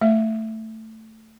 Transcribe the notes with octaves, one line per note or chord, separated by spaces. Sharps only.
A3 E5